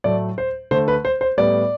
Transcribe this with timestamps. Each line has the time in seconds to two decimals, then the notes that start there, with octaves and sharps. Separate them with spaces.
0.04 A2 F#3 A3 D5
0.38 C5
0.71 D3 A3 C5
0.88 B4
1.05 C5
1.21 C5
1.37 A2 G3 B3 D5